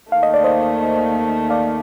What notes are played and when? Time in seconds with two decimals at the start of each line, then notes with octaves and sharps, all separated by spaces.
0.11 D#2 D#3 A3 F5
0.23 D#5
0.34 D5
0.44 C5 D#5
1.50 D5 F5